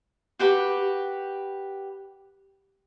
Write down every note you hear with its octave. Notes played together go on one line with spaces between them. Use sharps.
F#4 G4 B4 B5